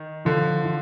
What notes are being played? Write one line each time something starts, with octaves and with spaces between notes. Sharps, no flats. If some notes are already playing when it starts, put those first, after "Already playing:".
Already playing: D#3
D3 F3
F3